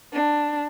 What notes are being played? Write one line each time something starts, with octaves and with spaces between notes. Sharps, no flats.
D4